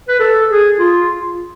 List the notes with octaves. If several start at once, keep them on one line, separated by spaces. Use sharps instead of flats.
B4
A4
G#4
F4